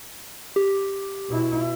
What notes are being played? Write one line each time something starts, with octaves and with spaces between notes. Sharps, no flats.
G4
B2 E4